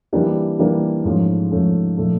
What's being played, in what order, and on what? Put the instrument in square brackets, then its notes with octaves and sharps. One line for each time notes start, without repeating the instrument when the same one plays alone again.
[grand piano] E3 G3 A#3 D4 G4
E3 G3 A#3 D4 G4
G#2 F3 A3 C#4
G#2 F3 A3 C#4
A#2 F3 A3